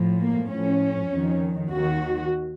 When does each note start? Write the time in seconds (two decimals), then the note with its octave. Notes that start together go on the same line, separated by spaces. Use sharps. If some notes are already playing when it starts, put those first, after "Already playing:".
Already playing: A2 F3
0.20 A#3
0.50 A2 F3 C#4
1.10 F2 D#3
1.70 D#2 D#3 F#4